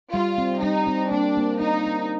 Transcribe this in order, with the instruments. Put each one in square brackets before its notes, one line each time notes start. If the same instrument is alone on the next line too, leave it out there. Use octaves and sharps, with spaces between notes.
[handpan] G3 [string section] F4
[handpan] C4
[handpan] G3 [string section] D#4
[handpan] C4
[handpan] A#3 [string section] D4
[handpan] A#3
[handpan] D4 [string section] D#4
[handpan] D4